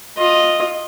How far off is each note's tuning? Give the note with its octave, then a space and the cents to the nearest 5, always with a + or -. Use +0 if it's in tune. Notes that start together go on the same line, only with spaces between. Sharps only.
F4 +15 D#5 +0